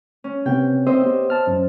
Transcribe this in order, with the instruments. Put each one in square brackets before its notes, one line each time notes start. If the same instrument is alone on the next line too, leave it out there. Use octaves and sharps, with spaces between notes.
[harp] C#4
[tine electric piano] C3 B3 C4 [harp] G5
[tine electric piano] C4 [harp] C5 D#5 E5
[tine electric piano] B3 G4
A5 F6
F#2